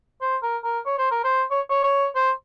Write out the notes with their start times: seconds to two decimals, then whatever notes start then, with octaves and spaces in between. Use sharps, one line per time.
0.21 C5
0.43 A#4
0.64 A#4
0.86 C#5
0.98 C5
1.11 A#4
1.24 C5
1.51 C#5
1.69 C#5
1.83 C#5
2.15 C5